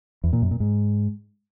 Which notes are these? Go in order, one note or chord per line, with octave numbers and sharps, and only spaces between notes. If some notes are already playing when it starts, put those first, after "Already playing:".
E2
A#2
F#2
A#2
G#2